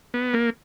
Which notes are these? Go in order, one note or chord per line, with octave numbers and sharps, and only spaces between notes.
B3
A#3